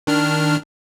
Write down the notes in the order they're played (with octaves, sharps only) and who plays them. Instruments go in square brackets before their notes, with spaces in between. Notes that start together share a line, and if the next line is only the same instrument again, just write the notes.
[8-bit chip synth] D#3 D4 F6